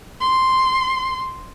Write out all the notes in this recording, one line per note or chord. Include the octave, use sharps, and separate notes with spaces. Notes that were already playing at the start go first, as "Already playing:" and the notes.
C6